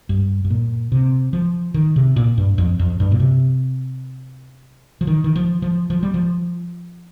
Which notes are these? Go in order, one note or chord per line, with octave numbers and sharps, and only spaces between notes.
G2
G2
A#2
C3
F3
D#3
C3
A#2
G2
F2
F2
G2
A#2
C3
F3
D#3
D#3
F3
F3
F3
G3
F3